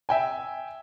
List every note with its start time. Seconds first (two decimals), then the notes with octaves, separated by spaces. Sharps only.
0.09 E5 G5 G#5